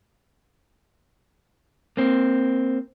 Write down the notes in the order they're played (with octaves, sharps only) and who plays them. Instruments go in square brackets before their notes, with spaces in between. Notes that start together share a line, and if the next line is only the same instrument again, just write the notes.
[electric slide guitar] A#3 C4